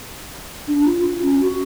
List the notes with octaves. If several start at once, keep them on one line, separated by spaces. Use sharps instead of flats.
D4
F4
F4
C#4
F#4